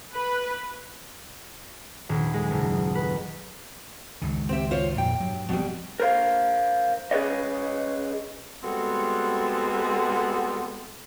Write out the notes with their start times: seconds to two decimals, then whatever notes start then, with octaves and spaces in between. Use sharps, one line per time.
0.14 B4
2.09 D#1
2.34 G#3
2.50 F#1
2.95 B4
4.22 C#2 F#2 D#3
4.49 C4 G4 E5
4.71 F4 C5 C#5
4.98 F2 A#2 G5
5.20 G2 F#3
5.49 E1 B2 F3 G3 C4
6.00 A#4 C5 F5
7.11 C#4 G#4 B4 C#5 D#5
8.63 G3 G#3 B3 C4 F#4 A4